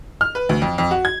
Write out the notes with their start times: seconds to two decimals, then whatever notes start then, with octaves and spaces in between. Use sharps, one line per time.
0.21 F6
0.35 B4
0.49 D2
0.62 F2
0.78 F2
0.91 F#4
1.05 G#6